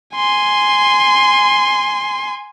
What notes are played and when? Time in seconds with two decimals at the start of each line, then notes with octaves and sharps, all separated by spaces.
0.16 G#5 C6